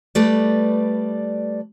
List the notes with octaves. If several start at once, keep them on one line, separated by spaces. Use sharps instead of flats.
G3 A3 B4 D5